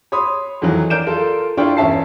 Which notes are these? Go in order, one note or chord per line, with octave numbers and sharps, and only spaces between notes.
C#5 B5 C6 D#6
F2 D#3 E3 F#3
A#4 D5 G6 D7 E7
F4 A4 A#4
D4 E4 F4 A#4 G5 C#6
E1 C#4 E5 A5 C7